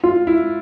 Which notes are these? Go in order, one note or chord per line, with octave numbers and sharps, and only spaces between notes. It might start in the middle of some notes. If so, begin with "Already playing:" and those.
F4
E4